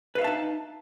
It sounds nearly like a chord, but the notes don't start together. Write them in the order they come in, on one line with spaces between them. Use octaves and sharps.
B4 F5 E5 A5 D#4